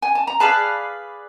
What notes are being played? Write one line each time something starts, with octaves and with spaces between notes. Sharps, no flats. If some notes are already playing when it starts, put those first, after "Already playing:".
G#5
A5
A#5
G#4 B4 D5 F5 A5 B5